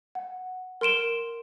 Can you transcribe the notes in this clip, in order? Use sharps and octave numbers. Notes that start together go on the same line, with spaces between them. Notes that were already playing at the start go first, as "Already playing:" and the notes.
F#5
A#4 C6 D7 E7 G7